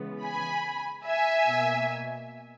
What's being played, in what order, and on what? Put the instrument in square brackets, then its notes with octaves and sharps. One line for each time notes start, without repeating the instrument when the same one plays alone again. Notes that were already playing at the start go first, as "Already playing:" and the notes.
Already playing: [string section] C#3 E3 G#3 B3
G#5 B5
E5 G#5
B2 A#3